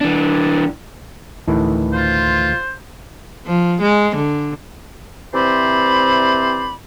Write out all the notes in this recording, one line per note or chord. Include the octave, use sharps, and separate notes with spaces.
E3 D4
D2 A2 D#3 E3
F4 C5
F3
G#3
D3
C3 E3 C4 C5 D5 B5